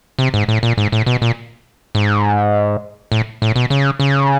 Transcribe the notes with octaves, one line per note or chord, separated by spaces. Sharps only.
C3
G#2
A2
A#2
G#2
A2
B2
A#2
G#2
A2
A2
B2
C#3
C#3